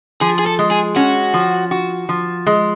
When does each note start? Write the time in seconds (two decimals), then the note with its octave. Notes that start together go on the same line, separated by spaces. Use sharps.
0.21 F3 G#4
0.39 G#4
0.46 A4
0.59 G#3
0.71 G#4
0.96 C#4 F#4
1.34 F3
1.71 F#4
2.09 F3
2.47 G#3